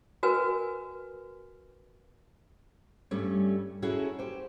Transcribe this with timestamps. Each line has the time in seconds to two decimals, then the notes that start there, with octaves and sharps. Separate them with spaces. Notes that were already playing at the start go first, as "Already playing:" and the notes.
0.23 F#4 A#4 B4 G#5
3.11 G2 G3 A3 C#4
3.82 C#4 D#4 E4 F#4 G#4 A4
4.19 G4 C5